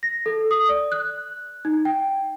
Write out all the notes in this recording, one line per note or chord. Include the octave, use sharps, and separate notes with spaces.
A#6
A4
D#6
D5
F#6
D#4
G5